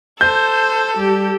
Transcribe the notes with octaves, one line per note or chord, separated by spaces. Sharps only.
A4 C5 G6
G3 G4